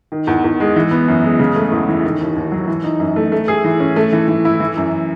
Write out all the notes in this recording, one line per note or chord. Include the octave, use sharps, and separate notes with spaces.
D#3
E2
E2
G#3
E3
B3
F#2
G#3
C#3
A3
E2
E3
D#3
D#2
D#2
F#3
E3
D#4
F#2
A3
A3
G#4
E3
C#4
A3
E3
E3
E4
E3
F#2